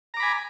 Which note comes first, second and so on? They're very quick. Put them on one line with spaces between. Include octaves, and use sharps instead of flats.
A#5 D6 B5 G#5